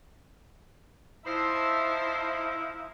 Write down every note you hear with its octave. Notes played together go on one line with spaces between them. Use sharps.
F3 D#4 E4 C5 E5 A5